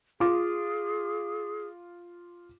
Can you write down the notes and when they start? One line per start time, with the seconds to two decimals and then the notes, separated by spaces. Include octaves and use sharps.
0.20 F4 G#4 D6